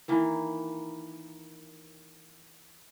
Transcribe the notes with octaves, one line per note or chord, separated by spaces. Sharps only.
D#3 E3 A#3